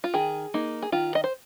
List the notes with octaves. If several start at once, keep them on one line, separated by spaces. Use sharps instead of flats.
F4
D#3 G#4
A#3 D#4
G#4
D#3 F4
D#5
C5